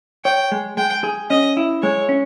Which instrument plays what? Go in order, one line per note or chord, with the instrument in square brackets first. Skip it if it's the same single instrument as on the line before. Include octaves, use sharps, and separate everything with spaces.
[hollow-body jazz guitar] C#5 [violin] G5
[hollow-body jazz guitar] G#3
[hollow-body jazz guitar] G#3 [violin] G5
[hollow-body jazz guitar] G#4
[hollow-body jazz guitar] C#4 [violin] D#5
[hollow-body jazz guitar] E4
[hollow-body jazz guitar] G#3 [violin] C#5
[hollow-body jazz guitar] C#4